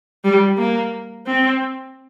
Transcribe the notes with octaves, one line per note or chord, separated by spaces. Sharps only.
G3
A#3
C4